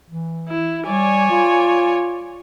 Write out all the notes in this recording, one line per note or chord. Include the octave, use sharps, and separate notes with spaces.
E3
E4
G3 C#5 D5 G#5
F4